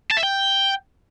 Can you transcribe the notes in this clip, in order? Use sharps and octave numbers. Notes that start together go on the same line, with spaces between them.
A5
E5
G5